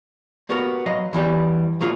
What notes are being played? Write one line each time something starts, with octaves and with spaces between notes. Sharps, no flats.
A#3 B3 F#4 G4 A#4
F#3 D#5 F5
E2 E3 G3 G4
F#3 A#3 F4 G#4